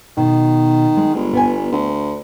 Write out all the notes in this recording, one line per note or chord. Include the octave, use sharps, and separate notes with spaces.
B2 D#3
G#3
G1
B3 G#5
D2